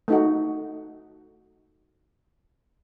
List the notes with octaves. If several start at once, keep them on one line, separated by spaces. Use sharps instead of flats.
A3 D#4 F#4